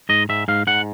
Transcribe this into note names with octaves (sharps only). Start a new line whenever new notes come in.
G#2 D#5
G#2 E5
G#2 F5
G#2 F#5